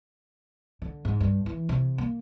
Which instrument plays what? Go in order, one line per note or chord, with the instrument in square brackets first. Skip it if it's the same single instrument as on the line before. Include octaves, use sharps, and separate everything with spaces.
[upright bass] D3
G#2
G2
E3
C3
A#3